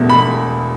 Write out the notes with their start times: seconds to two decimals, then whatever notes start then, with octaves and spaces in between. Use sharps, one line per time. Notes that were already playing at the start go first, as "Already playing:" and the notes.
Already playing: E1 E2 B2 A3
0.09 B5